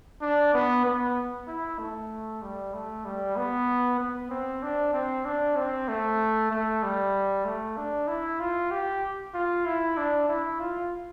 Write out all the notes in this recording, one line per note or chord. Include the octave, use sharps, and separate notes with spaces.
D4
B3
B3
E4
A3
G3
A3
G3
B3
B3
C4
D4
C4
D4
C4
A3
A3
G3
A3
D4
E4
F4
G4
F4
E4
D4
E4
F4